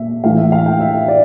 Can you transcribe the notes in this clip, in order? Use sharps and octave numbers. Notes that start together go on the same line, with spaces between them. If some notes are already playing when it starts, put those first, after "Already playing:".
Already playing: A#2 E5
A2 E3 F5
E5
F5
G5
E5
D5